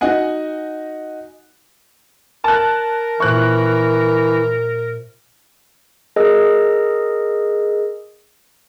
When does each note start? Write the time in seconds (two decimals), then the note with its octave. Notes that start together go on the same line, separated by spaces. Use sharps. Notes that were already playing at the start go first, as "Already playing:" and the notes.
0.01 D#4 F#4 D#5 F#5 G#5
2.44 A#4 A5 F#6
3.20 A#2 E3 C5 E5 C#6 F#6
6.16 G#4 A#4 D#5 E6